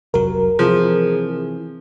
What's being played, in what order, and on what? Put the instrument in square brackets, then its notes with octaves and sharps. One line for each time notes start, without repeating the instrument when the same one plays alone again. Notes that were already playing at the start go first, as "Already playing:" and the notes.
[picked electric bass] F1 C2 F#3 [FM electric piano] A#4
[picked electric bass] C3 E3 [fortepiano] F3 [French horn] G#4